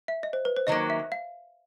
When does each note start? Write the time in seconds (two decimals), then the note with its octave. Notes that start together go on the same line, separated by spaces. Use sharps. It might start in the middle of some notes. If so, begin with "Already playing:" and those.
0.08 E5
0.23 D#5
0.33 C5
0.45 B4
0.57 C5
0.67 D#3 F#3 A#3 D#5
0.90 E5
1.12 F5